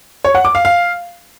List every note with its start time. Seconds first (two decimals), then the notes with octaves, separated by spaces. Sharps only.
0.24 C#5
0.35 F#5
0.45 D6
0.55 F5
0.65 F5